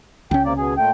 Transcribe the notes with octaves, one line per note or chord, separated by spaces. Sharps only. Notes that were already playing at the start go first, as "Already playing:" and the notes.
C#2 C#4 G5
C3 A#3 D5
B2 G#4
A#2 A3 G5